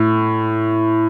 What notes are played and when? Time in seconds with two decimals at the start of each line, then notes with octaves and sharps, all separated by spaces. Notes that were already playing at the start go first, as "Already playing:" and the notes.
Already playing: A2